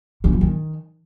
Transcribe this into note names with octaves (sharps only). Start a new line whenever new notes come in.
D3
F3
D#3